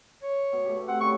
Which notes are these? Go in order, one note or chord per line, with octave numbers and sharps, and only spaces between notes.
C#5
B2
A3 G4
C4 F#5
C#3 G3 E4 C#6